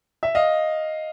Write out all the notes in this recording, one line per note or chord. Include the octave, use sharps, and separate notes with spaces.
E5
D#5 F5